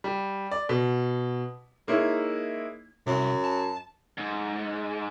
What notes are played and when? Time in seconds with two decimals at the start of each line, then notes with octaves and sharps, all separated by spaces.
0.04 G3
0.51 D5
0.69 B2
1.87 G#3 A#3 D#4 E4 C#5
3.07 C2 F#2
3.44 A5
4.18 G#2